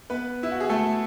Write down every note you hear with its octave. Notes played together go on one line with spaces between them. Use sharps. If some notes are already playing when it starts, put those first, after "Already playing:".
B3 B4
E4
F#4
G#4
A3 A4